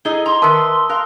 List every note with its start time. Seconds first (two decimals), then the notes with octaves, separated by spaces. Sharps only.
0.05 D#4 E4 G#4 A4 D#5 G7
0.26 A#5 C6
0.42 D#3 A#4 B4 E5 A5 B5 D#6 E6
0.89 A#4 F5 F#6